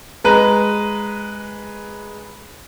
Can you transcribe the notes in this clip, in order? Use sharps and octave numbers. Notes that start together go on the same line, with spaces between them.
G#3 B4 A#5